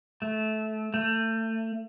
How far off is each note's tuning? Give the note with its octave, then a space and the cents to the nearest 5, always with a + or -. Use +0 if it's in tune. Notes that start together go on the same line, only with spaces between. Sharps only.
A3 -20
A3 +30